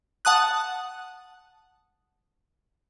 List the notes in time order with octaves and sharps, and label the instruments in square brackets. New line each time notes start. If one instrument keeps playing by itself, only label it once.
[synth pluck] F#5 A5 D#6 F#6